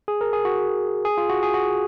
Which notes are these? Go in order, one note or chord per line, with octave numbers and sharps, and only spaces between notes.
G#4
A#4
G#4
F#4
G#4
F4
F#4
G#4
F#4